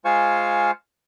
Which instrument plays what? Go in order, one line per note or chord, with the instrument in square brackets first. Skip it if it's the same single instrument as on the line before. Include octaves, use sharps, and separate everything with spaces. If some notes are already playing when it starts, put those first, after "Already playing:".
[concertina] G#3 F4 C5 F5 G#5 C#6